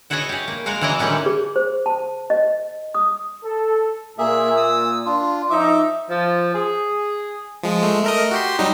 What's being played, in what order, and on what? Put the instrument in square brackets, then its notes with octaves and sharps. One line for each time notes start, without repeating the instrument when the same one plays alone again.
[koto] E4 F#4 G#4 B4 C#5 D#5
G4 G#4
A#3
G#3 F#4 A#4 F5
E3 F#3 E4 D5 D#5
D3 D#3 F#3 G3 B3 C#4
[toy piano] G#4
C5
A5
D#5
D#6
[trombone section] A4
[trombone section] A#2 [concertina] A#3 G#4 E5
[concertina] D#6 E6
D4 F4
[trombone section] F3 D#4 [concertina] E5 D6
[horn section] F3
G#4
[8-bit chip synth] F3 G#3
G#3 A3
A3 A#4 D#5
F#4 G4 C6
F#3 G3 D#4